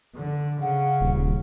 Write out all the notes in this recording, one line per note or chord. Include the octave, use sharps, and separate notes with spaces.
D3
C#3 F#5
D#1